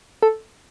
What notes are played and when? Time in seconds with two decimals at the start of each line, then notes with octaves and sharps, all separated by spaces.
0.22 A4